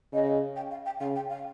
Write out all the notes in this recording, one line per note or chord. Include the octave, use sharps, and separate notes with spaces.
C#3 D#5
G5
F5
G5
C#3 F5
G5
F5